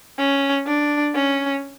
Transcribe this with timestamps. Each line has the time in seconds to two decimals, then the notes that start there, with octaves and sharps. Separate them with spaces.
0.18 C#4
0.67 D4
1.15 C#4